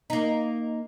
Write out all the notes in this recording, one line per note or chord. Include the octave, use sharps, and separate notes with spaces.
A#3 D#4